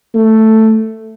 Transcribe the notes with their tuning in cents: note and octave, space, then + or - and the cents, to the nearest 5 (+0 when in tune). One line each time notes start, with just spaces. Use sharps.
A3 +5